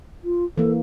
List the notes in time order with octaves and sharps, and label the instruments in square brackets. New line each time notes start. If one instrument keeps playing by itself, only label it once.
[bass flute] F4
[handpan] E3 A#3 [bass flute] A4